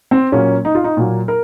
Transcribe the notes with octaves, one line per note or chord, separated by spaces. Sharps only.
C4
A#2 F#3 A#3 C#4
D#4
F4
D#4
A#2 F#3 A#3
A#4